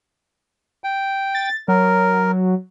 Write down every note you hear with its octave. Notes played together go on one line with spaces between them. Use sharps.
G5
A6
F#3 A#4